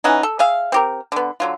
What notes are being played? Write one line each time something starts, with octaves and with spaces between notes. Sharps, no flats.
E3 C#4 D#4 F#5
A4
G#4 E5 F5
C4 G4 A#4
D3 B3
D3 F#3 F4